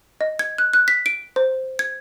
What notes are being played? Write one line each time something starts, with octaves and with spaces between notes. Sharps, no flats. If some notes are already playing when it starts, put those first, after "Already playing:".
D#5
G#6
F#6
F#6
B6
D7
C5
G#6